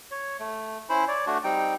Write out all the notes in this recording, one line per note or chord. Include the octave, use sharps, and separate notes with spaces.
C#5
A3
C#4 E4 C5 B5
C#5 D5
A3 D4 F#4
G3 C4 D#4 G5